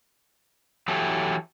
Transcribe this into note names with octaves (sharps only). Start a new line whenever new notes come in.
E3 F#3 E4 G4 A4